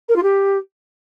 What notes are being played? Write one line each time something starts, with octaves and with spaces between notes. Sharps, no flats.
A#4
F4
G4